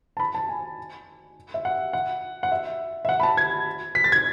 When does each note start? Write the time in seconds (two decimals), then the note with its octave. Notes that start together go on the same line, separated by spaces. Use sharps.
0.17 A5
0.20 B5
0.34 A5
0.49 G#5
1.54 E5
1.65 F#5
1.93 F#5
2.43 F#5
2.51 E5
3.05 E5
3.09 F#5
3.20 B5
3.23 A5
3.37 G#6
3.95 B6
4.04 A6
4.12 G#6